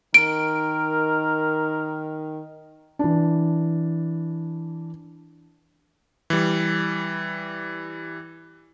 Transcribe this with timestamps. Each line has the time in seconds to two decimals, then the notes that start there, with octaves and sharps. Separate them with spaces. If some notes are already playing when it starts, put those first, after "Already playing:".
0.14 D#3 A#4 D7
2.99 E3 D4
6.30 E3 G3